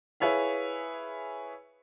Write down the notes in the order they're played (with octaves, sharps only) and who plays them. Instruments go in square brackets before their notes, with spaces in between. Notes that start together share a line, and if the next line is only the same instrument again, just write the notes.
[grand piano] E4 G#4 B4 C#5 E5 F5